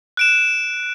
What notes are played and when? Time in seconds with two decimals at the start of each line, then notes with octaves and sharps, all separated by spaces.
0.17 F#6 D7 E7